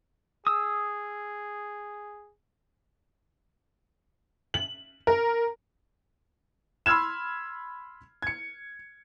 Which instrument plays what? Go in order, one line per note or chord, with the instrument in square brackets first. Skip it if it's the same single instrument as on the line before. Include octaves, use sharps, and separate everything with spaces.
[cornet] G#4 [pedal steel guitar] D#6 E6
[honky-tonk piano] F#7
A#4
[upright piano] B5 C6 E6 F6 G#6 E7
G#6 C#7